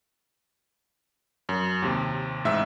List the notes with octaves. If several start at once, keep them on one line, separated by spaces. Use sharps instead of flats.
F#2
D#2 C3
A1 G#2 E5 E6